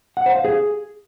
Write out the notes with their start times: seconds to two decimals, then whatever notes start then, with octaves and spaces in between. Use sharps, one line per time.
0.17 F#5
0.26 C5
0.35 F5
0.45 G#4